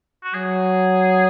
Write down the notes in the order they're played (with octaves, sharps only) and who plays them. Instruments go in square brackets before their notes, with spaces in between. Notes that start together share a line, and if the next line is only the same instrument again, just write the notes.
[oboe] F#4
[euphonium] F#3 [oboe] G#4